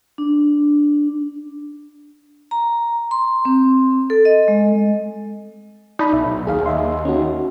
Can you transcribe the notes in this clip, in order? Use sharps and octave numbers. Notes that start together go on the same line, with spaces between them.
D4
A#5
C6
C4
A4
D#5
G#3
D#4 D5 A5 B5
B1 E5
D#2 G#4 F5
D#5 E5 C6
C#4 D#4 F#4